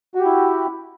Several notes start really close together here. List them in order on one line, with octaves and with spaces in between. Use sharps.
F#4 G4 E4